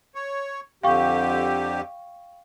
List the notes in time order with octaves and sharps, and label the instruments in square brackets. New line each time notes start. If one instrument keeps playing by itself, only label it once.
[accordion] C#5
[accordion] F2 D3 G4 [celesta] F5 G5 C#6